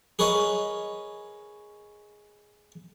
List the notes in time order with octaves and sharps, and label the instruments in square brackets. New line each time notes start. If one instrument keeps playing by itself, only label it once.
[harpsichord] G#4 A#4 B4 C#5 D#5